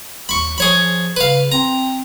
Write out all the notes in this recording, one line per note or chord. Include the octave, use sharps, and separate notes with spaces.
D#2 B5 C#6
F3 G#4 C#5 B5
C#3 B4 F5
C4 A#5